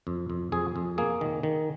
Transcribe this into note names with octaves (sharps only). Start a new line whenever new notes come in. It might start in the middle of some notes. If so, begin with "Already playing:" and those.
F2
F2
F2 G#4
F2
A#3 G#4
D#3
D#3